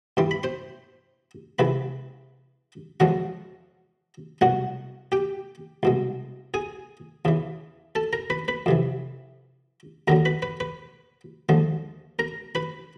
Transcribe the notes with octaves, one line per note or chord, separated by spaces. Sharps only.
G2 E3 G3 C6
B5
C5 C6
C#2 C3 E3 G#3 B4 B5
E2 C#3 F3 G#3 F#4 F#5
C2 B2 F#3 F#4 F#5
G4 G5
C2 B2 G#3
G#4 G#5
E2 C#3 E3
A4 A5
A#4 A#5
B4 B5
B4 B5
F2 C3 E3
D#2 D3 F#3 A#4 A#5
B4 B5
B4 B5
B4 B5
D#2 D3 F3 G#3
A#4 A#5
B4 B5